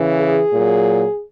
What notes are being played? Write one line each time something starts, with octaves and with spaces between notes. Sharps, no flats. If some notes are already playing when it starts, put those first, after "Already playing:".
Already playing: C#3 E3
G#4
A#2 F#3